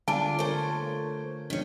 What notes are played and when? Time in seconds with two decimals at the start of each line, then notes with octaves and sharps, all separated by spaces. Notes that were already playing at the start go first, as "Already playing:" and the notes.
0.08 D3 D4 F4 G#5 A5
0.39 A3 F4 A#4 C5 C#5
1.50 B2 D#3 F3 C#4 D4